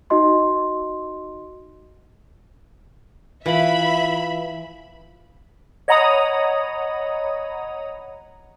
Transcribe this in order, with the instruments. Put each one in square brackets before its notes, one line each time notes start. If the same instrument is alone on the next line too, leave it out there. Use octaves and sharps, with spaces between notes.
[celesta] D#4 F#4 D#5 C6
[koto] E3 [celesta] F4 F5 F#7 [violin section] E5 B5
[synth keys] C#5 D#5 F#5 A#5 B5 D#6